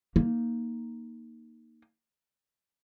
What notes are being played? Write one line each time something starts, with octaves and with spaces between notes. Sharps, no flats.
A#3 D#4